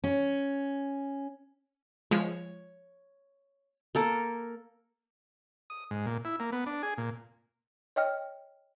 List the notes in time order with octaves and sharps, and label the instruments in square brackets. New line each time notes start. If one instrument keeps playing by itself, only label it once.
[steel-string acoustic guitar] C#4
[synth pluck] F3 G#3 [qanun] C#5
[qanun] A#3 A4 A#4
[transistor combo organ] D#6
G#2
A#2
E4
A#3
B3
D4
G#4
A#2
[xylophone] C#5 D#5 G5 F6